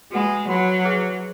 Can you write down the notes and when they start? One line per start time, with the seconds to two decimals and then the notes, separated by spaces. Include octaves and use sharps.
0.12 G#3 F#4 B4 F#5 B5
0.48 F#3 F#4 B4 F#5 B5
0.85 G#4 B4 E5 G#5